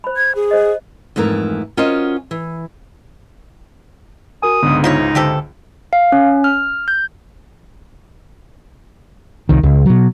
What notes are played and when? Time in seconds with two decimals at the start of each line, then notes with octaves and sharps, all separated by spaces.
0.04 C5 B5
0.16 G#6
0.35 G#4
0.51 C5 D#5
1.16 F2 G#2 E3 A3 A#4
1.77 C#4 F4 F#4 A#4 C5 D#5
2.31 E3
4.42 F#4 A#4 G#5 D#6
4.63 C#2 G#2 D3 B3 D4
4.84 F3 D#4 E4 C#5
5.15 D3 E3 G4 A4 C5
5.93 F5
6.12 C#4
6.44 F6
6.88 G6
9.49 C2 D#3
9.63 C#2
9.86 B2 F#3